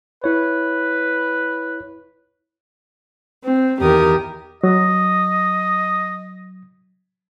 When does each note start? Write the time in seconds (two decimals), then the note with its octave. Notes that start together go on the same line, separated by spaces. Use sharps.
0.24 E4 B4 C#5
3.43 C4
3.80 E2 D#3 G4 A#4 D#6
4.64 F#3 D#5